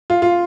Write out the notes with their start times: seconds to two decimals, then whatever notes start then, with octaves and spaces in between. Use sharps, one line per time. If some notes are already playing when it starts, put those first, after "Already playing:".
0.10 F4
0.22 F4